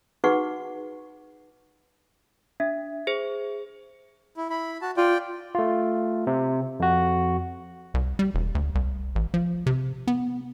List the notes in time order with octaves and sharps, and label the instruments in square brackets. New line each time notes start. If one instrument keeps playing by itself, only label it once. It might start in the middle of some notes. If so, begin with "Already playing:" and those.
[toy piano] D#4 F#4 G#4 B4 F#5 C#6
[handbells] D4 [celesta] E5
[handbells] G#4 C5
[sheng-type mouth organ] E4
E4 B5
F#4 A5
[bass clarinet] F4 [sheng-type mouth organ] D5 G5
[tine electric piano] A3 F4
C3
F2 F#4
[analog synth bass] C2
G3
E1
D2
C2
A1
F3
C3
B3